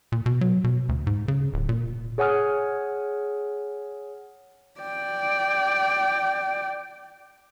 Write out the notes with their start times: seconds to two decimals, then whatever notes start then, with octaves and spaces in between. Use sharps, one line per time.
0.12 A#2
0.26 B2
0.41 F#3
0.64 B2
0.89 D2
1.07 G#2
1.28 C#3
1.54 D1
1.69 A#2
2.18 G#4 C#5 F#5 G#5 D#6 F6
4.81 D5 G5